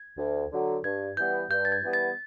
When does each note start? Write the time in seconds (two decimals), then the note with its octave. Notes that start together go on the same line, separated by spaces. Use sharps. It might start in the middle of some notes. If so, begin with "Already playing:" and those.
Already playing: G#6
0.18 D2
0.52 D3 F#3
0.84 G2 G#6
1.17 E3 G3 B3 G6
1.50 G2 G6
1.65 A6
1.72 G#6
1.83 E3 G3 B3
1.93 A6